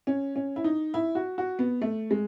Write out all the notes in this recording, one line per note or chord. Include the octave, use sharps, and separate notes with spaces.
C#4
C#4
E4
D#4
E4
F#4
F#4
B3
A3
G#3